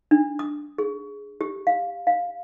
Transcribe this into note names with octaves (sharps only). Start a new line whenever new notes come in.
D4
D#6
G#4
G4
F5
F5